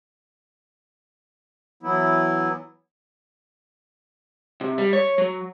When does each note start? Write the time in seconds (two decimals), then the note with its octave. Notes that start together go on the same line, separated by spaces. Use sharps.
1.83 E3 F#3 B3 E4
4.61 C3
4.78 G3
4.93 C#5
5.18 F#3